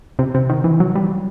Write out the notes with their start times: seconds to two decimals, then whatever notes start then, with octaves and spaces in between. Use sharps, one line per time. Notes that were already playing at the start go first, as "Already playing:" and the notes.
0.19 C3
0.34 C3
0.49 D#3
0.64 E3
0.80 F#3
0.95 G3